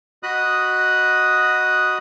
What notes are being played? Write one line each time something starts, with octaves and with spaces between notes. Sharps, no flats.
F#4 D#5 B5 D#6 F#6